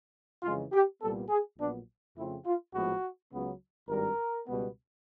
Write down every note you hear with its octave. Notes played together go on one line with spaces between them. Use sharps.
F2 C#3 E3 G#3 F4
G4
C2 A#2 G3 B3 A4
G#4
A#1 A#2 F#3 B3 D4
F2 C#3 F3 A3 C4 E4
F4
A#1 A2 F3 G#3 B3 F#4
C#2 C#3 F#3 B3
G#1 G2 D#3 G3 A#4
C#2 B2 G3 B3